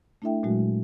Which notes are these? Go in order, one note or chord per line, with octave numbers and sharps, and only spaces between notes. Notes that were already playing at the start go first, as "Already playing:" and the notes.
A3 D4 E4 A4 E5 G5
A#2 F#3 G#3 F#4